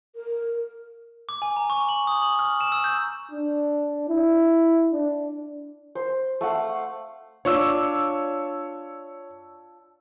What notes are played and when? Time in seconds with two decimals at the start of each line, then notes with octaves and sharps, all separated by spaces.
0.16 A#4
1.29 D6
1.42 G#5
1.57 A#5
1.70 C#6
1.89 F#7
2.07 D#6
2.22 F#7
2.39 F6
2.61 E7
2.72 E6
2.84 G6
3.31 D4
4.09 E4
4.92 D4
5.95 C5
6.41 A3 F5 F#5
7.45 D4 F4 C#5 C#6 E6